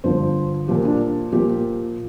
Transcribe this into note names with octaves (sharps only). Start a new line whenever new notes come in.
G2 D3 F3 C5
A#2 F3 G4
D4
A#2 F3 G4